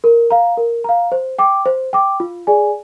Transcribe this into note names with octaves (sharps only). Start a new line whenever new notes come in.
A#4
F5 A#5
A#4
F5 A#5
C5
G5 D6
C5
G5 D6
F4
G#4 D5 G#5